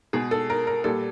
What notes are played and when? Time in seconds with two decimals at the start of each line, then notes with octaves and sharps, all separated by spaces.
0.13 B2 G#3 G#4
0.31 A4
0.50 A#4
0.67 A#4
0.84 A#2 G3 A4